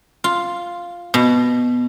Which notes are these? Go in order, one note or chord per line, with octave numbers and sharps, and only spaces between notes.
F4
B2